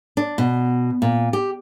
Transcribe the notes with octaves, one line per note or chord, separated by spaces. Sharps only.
D4
B2
A#2
G4